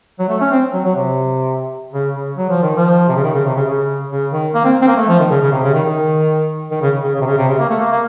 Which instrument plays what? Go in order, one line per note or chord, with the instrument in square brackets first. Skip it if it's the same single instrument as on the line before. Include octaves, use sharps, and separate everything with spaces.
[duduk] F#3
A3
C#4
C4
F#3
F#3
C3
C#3
C#3
F#3
F3
D#3
F3
C3
C#3
D#3
C#3
C3
C#3
C#3
C#3
D#3
A#3
C4
C4
A#3
A3
F3
D#3
C#3
C#3
C3
C#3
D#3
D#3
D#3
C#3
C#3
C#3
C3
C#3
C3
C#3
A#3
A3
A#3
A#3